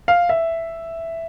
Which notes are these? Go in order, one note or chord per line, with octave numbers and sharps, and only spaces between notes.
F5
E5